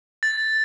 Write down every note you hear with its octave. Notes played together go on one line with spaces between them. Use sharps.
A6